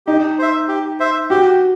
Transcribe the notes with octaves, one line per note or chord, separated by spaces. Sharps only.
D#4 G4
C5 E5
G4
C5 E5
F#4 G4